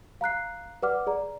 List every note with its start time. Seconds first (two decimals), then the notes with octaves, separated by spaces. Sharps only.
0.21 F5 A#5 F#6 C7
0.83 B4 D5 F#5 D6 F6
1.07 G#4 D5 A#5